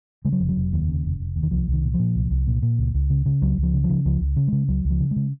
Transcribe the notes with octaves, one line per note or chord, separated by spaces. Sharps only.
C#3 G#3
F#3
F1 F3
F#3
F1
D#2
C#3
F1
F1
D#2
D#3
C2 F3
C2
D#3
A#2
A#2 F3
C2
C2
A#2
A#2
C#2
C#2
C#3
C#3
C#2 F#3
C#2
F3
C#3
F3
C#3
C#2 F3
C#2
C#3
C#3 G#3
C#2 F#3
C#2
F3
C#3
G#3
C#3